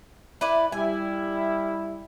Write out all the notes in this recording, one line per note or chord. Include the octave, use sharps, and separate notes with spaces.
E4 B4 D5
G3 E4 G#5